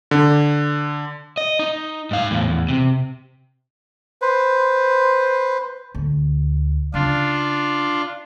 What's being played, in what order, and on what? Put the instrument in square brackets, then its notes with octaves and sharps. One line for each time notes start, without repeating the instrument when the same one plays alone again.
[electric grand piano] D3
[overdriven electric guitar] D#5
D#4
G#2 F5
E2 A2
E2
C3
[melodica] B4 C5
[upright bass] D2
[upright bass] C#3 [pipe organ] D4 F4